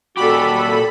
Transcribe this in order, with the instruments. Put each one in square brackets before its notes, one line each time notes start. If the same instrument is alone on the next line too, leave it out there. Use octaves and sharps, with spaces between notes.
[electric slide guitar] A#2 G4 [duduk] F#4 [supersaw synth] A4 B5